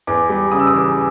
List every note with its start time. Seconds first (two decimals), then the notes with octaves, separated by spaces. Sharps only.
0.07 E2 D6
0.29 G3
0.52 C#3 D#6
0.60 E6
0.67 D#6
0.74 E3